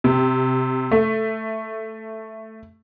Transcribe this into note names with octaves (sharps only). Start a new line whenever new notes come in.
C3
A3